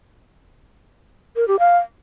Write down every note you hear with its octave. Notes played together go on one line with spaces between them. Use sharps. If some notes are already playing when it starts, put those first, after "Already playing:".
A#4
G4
F5